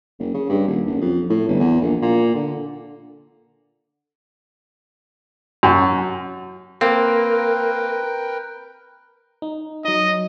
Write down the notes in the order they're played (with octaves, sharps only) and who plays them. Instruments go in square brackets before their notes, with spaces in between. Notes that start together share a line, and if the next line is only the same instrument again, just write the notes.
[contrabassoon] F#1
C#3
G2
D#1
F#1
F2
A2
G1
E2
A#1
A#2
D3
[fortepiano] F#2
[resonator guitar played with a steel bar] A#3 [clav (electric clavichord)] C4 [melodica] A#4 B4 G5
[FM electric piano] D#4
[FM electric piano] F#3 D#4 [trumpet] D#5